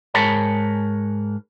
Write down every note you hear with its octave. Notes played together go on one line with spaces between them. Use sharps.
G#2 G#4 A#4 C#5 A5 B5